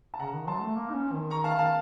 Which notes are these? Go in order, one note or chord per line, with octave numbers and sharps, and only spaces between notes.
A5
C#3 F#5 A#5
D#3
F#3 A5 C6
A3
A#3
D#4
C#4
D#3
A#5 C#6
F5 A5
F5 A5